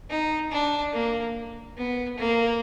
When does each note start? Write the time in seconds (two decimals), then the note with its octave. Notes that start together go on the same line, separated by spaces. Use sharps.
0.10 D#4
0.51 D4
0.93 A#3
1.77 B3
2.18 A#3